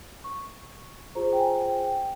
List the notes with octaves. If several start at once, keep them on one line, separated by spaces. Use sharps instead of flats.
C#6
F4 G#4 C5 A#5
G5
G#5
G5
G5